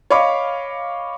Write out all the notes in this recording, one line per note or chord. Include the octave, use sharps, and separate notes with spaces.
C#5 D#5 F5 B5 C#6 D6